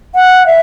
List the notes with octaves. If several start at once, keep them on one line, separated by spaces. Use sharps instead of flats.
F#5
E5